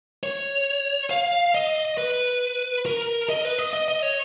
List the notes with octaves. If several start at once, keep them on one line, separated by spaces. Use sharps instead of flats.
C#5
F5
D#5
B4
A#4
D#5
B4
D#5
D#5
D#5
C#5